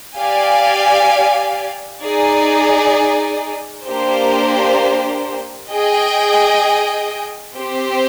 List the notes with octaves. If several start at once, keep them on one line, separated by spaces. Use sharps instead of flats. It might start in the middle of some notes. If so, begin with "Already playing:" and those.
G4 D5 F5 G#5
D#4 G#4 D5
A#3 D4 G4 C5
G#4 D#5 G5
C4 G4 C5